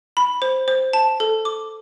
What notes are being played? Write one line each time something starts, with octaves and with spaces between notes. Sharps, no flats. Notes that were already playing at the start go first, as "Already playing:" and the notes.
B5
C5
C5
A5
A4
D6